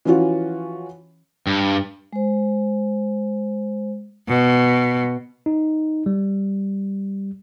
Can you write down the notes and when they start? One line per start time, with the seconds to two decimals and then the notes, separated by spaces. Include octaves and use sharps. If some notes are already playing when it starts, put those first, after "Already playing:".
0.05 E3 F3 C#4 F4 F#4
1.47 G2
2.13 G#3 C5
4.28 B2
5.46 D#4
6.06 G3